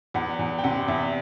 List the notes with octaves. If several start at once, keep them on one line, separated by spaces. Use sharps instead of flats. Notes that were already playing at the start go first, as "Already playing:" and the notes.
E2 F#5
E2
G5
C3 F#5
E2 E5